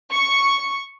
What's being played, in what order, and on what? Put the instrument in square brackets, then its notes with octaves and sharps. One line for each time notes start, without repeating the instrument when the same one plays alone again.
[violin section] C#6